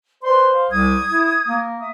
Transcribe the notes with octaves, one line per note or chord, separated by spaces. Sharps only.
B4 C5 D5 C6
F5
C2 D#6 G#6
E4
A#3
E5 D#6